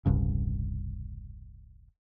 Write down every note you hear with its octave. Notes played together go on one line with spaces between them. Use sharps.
E1 C2 G2 C#3